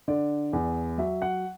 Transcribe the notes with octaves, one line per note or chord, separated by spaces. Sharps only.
D3 D5
E2
F#3 E5
F#5